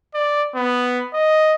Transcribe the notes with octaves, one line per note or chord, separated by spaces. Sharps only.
D5
B3
D#5